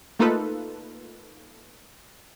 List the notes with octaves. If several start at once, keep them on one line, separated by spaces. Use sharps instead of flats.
A3 A#3 D#4 F4 A4 B4